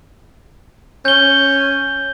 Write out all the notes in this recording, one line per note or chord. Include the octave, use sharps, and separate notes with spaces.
C#4 G6 G7